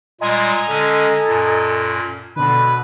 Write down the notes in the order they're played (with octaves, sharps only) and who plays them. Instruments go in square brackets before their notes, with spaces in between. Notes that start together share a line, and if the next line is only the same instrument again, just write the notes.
[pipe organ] A#2 G3 G#3 [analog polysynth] D#5 G#5 A#5 [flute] C6
[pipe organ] D3 G#3 C#4 [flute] A4
[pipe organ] F#2 A#2
[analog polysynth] B2 D3 [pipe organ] B4 [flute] B5